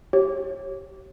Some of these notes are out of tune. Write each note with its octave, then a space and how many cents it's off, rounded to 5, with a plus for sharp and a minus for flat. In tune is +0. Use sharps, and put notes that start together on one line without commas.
G4 -25 C#5 -20